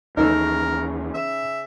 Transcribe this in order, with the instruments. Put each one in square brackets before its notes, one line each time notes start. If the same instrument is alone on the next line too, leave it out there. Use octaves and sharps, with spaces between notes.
[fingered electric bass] D#2 E3 [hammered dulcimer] C#3 [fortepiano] D#4 A4 E6 [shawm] A#4
[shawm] E5